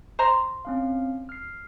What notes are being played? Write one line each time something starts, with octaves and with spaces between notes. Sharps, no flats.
C5 A#5 C6
C4 C#4 F5
F6 C7